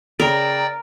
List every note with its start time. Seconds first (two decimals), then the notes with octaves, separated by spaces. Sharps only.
0.20 C#3 A#4 D5 G5 A#5